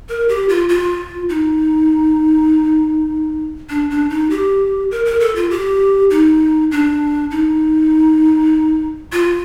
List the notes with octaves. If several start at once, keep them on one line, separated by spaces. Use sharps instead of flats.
A#4
G4
F4
F4
D#4
D4
D4
D#4
G4
A#4
A#4
A4
F4
G4
D#4
D4
D#4
F4